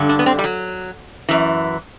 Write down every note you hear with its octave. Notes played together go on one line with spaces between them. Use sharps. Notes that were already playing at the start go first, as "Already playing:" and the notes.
Already playing: G2 D3
D4
B3
C4
G3
F#3
F#2 E3